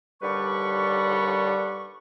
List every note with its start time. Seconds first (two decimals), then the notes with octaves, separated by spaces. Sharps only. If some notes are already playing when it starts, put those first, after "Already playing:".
0.22 D#2 D3 G3 G4 B4 C#6